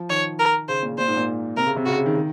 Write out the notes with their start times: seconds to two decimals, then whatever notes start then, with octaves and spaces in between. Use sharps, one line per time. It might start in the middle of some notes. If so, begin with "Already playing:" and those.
Already playing: F3
0.10 D#3 C#5
0.39 A#4
0.68 C#3 C5
0.83 A#2
0.98 A#2 C5
1.08 G#2
1.17 A#2
1.57 C3 A#4
1.67 C#3
1.76 C3
1.86 C#3 F#4
1.96 C#3
2.06 D#3
2.16 D#3